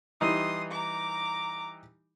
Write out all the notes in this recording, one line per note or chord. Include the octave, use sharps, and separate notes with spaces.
E3 G3 D#4 C6 D#6
A#5 D6